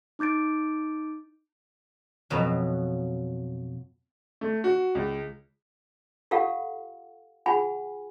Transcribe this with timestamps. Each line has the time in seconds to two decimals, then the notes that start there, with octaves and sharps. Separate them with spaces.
0.19 D#4 D6 G6 A6 D7
2.30 F2 B2 F#3
4.41 A3
4.64 F#4
4.95 C#2
6.31 F4 G4 A4 F5 F#5
7.46 F4 G#4 F#5 G#5 B5